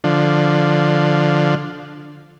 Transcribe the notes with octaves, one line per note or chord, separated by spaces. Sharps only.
D3 F3